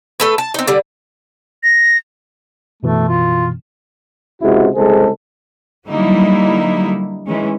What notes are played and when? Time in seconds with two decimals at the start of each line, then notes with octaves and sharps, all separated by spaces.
0.20 A3 A4 B4
0.38 A5
0.54 C4 D#4
0.67 D3 G3
1.64 A#6
2.83 F#2 B2 E3 A3
3.09 F4
4.42 C#2 C3 G#3 E4 F#4
4.75 C2 C#3 G#3 G#4 A4 C5
5.87 D3 F#3 G3 A#3 D#4 E4
7.25 D#3 E3 G#3 C#4